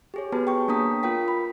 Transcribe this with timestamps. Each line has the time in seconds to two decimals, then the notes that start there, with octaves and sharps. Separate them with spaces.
0.14 G4 G#4 C#5
0.32 B3 F#4 G#4 B4 A5
0.47 G5 C#6
0.68 A#3 D4 C#5 A#5 D#6 B6
1.03 F4 A#4 G5 B6
1.28 B5